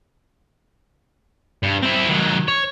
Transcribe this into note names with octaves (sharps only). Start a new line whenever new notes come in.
G2
C4 E4
D#3 F#3
C#5